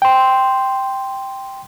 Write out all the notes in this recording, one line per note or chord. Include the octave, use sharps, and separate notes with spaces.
G5 C6